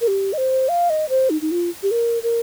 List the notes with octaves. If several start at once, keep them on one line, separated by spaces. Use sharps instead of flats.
A#4
G4
D#5
C5
F5
D#5
C5
D#4
D#4
F4
G4
A#4
A#4